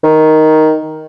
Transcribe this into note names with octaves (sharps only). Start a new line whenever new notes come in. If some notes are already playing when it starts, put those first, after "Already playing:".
D#3